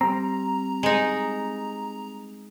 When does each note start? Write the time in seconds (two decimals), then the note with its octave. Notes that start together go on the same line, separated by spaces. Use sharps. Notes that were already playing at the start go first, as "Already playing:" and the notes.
0.01 G3 C4 A#5
0.83 G#3 D#4